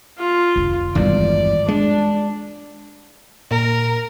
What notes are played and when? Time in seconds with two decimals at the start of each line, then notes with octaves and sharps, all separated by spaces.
0.19 F4
0.56 F1 D3
0.95 G#1 E2 G2 G3 D5
1.68 G#3 D4
3.51 A#2 A#4